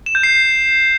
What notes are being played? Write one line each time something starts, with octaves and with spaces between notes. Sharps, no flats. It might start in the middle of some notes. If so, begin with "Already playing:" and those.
E7
G6
C7